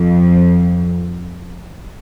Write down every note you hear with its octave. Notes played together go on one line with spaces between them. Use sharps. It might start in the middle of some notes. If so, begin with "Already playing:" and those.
Already playing: F2